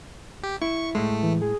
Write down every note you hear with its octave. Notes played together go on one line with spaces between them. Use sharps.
G4
E4 C#6
A2 G#3 A3
E3
G#4